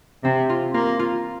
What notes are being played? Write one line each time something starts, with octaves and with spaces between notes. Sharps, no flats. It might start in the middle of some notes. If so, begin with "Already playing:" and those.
C3 C4
F4
A#3 F4
F4